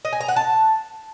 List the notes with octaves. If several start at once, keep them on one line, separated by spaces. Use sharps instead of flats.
D#5
G#5
A#5
F#5
A5